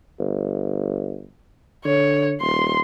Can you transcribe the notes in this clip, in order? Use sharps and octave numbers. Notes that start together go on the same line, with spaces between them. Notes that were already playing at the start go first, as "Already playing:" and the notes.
G1
D3 C#5
D#1 C6